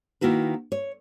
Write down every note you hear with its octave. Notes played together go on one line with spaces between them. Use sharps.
D#3 A#3 E4 F#4 B4
C#5